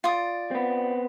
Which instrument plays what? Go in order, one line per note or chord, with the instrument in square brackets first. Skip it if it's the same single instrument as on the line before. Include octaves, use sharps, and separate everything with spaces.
[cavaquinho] F4 D5 D#6
[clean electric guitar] B3 C4